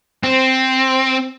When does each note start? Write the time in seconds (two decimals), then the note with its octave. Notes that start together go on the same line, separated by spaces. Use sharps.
0.23 C4